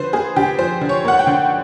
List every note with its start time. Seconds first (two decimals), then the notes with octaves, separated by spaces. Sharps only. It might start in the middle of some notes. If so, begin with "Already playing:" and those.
Already playing: D3 F3 B4 C5
0.13 A#3 G#4
0.36 D3 G4
0.59 F3 C5
0.81 D3
0.89 C#5
1.05 A#3 F#5
1.19 G5
1.27 D3